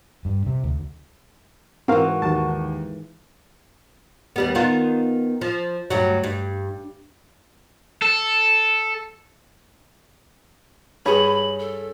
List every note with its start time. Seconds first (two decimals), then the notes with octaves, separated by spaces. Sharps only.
0.25 G2
0.46 C3
0.63 D2
1.88 G#2 E3 C4 F#4 A#4 F5
2.22 D#2 A5
4.36 D#2 G3 B3
4.55 D#3 B3 F4
5.41 F3
5.90 D2 G2 F#3
6.24 G2
8.02 A4
11.06 G2 G#4 C#5 B5
11.60 A4